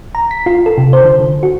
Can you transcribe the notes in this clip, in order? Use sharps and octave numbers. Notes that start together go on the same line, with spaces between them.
A#5
B6
F4
A4
C3
C5
D3
D3
F#4